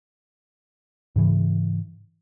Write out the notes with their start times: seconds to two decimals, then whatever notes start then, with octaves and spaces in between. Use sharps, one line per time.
1.16 G#2 C#3 E3